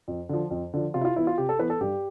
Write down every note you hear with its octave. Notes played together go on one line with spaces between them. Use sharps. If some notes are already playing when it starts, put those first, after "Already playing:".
F2
D3 F3
F2
D3 F3
C3 F4
E4
F4
E3 B3 E4
F4
C3 G4
A4
E3 B3 B4
A4
G2 G4